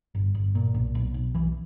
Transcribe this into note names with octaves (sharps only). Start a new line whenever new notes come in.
G1
G1
A#2
B1
B1
B1
B1 E3